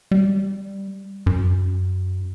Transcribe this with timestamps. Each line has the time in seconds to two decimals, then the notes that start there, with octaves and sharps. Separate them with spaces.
0.11 G3
1.26 F#2